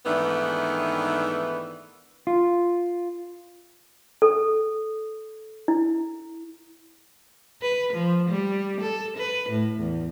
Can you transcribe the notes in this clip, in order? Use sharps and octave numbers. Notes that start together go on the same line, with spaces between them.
G#2 D#3 E3 A3 B3 D4
F4
A4
E4
B4
F3
G3
A4
B4
A2
E2